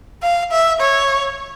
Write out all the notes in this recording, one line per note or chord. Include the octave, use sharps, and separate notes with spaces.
F5
E5
C#5